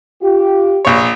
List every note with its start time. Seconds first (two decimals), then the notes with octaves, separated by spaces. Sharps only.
0.22 F4 G4
0.85 A#1 C#5